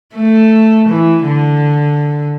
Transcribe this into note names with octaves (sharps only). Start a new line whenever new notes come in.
A3
E3
D3